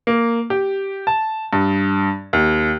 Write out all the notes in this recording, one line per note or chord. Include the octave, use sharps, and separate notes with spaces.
A#3
G4
A5
G2
D#2